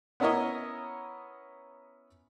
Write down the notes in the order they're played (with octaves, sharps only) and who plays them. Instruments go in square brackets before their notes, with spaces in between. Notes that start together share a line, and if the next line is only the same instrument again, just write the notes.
[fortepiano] B3 C#4 E4 A#4 C#5 D#5